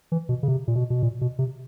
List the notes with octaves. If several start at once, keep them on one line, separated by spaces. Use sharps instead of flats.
E3
B2
C#3
C3
A#2
B2
B2
A#2
B2
C3